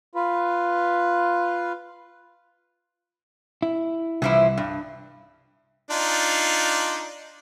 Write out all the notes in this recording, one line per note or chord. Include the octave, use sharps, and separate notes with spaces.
F4 B4
E4
C2 E3 F3 E4
G2
D4 D#4 F4